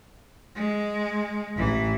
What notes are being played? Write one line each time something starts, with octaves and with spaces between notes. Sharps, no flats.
G#3
A1 E3